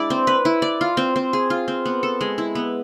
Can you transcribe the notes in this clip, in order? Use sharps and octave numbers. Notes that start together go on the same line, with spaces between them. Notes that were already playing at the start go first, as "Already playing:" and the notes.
Already playing: G#3 D4 E4 D5
C4
B4
E4
D5
F4
C4
C4
G#4
F4
C4
B3
A4
G#3
E4
B3